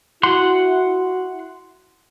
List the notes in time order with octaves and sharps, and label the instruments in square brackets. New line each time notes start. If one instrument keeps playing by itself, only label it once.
[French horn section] E4 F#4 [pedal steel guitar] F#5 C6